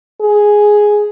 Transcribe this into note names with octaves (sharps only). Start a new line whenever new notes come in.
G#4